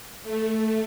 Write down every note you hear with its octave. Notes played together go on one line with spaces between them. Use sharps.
A3